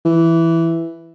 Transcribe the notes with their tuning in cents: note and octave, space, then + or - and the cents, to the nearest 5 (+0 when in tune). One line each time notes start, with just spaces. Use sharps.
E3 +5